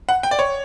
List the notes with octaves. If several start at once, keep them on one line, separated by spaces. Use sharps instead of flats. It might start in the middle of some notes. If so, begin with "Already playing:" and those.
F#5
G5
D5
C#5